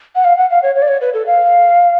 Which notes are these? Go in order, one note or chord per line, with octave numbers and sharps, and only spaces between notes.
F#5
F5
F#5
F5
C#5
C#5
D5
C#5
B4
A4
F5